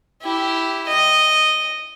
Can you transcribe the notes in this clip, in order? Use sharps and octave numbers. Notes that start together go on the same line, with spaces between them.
E4 G4
D#5